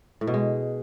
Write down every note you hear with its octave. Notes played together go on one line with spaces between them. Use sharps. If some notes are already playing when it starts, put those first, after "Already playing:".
A2
B2
G#3